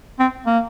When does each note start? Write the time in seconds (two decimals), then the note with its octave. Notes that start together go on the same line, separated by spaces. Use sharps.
0.19 C4
0.46 A#3